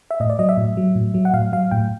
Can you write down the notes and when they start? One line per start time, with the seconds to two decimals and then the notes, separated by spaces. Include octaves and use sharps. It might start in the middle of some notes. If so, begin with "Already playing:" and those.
0.11 E5
0.20 A2 D#5
0.30 D5
0.39 F#3 D#5
0.49 E5
0.57 A2
0.77 F#3
0.96 A2
1.14 F#3
1.25 F#5
1.34 A2 F5
1.52 F#3 F5
1.71 A2 G5